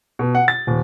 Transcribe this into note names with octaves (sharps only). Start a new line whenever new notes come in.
B2
F#5
A6
D#1